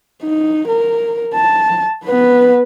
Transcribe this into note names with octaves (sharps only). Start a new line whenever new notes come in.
D#4
A#4
A5
B3 B4